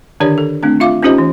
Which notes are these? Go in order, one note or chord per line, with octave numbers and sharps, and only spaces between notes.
D3 D#3 D4 G4 C#5 D5
A4
A3 C4 D4
F4 E5 F5 D6
C#4 D#4 F4 G4 C5 D#5
E3